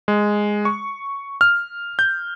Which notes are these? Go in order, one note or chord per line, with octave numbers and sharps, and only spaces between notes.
G#3
C#6
F6
G6